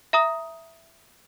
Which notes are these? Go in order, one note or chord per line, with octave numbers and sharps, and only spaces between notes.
E5 A#5 D#6